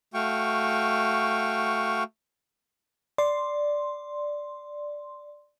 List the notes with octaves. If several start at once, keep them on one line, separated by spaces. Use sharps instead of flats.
A3 F#4 F5 G5 C#6
D5 C6